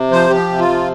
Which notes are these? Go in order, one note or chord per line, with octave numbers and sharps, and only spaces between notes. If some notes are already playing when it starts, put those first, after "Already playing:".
Already playing: C3
F3 C5
F3 G4
C3
F4
F3